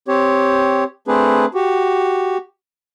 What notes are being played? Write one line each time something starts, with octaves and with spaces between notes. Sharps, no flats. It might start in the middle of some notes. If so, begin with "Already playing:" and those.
C4 G4 C#5
A3 C4 D4 G#4 B4
F#4 G4